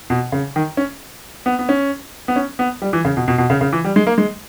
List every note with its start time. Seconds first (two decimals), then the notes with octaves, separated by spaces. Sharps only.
0.10 B2
0.32 C#3
0.56 D#3
0.77 C#4
1.46 B3
1.59 B3
1.69 C#4
2.28 B3
2.36 C#4
2.59 B3
2.82 G3
2.93 E3
3.05 C#3
3.17 B2
3.28 B2
3.38 B2
3.50 C#3
3.61 C#3
3.72 E3
3.84 G3
3.96 G#3
4.07 A#3
4.18 G#3